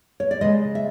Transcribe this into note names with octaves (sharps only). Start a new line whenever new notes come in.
C#5
D5
C#3 F3 G#3 D#5
E5